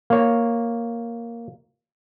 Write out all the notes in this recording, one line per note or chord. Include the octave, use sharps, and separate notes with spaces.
A#3 C#5